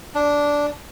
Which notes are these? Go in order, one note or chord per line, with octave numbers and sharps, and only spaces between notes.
D4